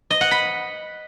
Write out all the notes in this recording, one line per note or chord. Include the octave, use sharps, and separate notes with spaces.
D#5
F#5
B5